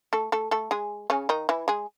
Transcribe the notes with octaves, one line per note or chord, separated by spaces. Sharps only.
A3 A4
A3 A4
A3 A4
G#3 G#4
C#3 C#4
D#3 D#4
E3 E4
G#3 G#4